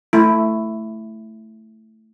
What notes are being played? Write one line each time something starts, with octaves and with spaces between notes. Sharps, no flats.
A3 E4